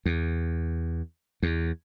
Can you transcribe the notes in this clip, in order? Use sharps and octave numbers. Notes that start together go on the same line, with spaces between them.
E2
E2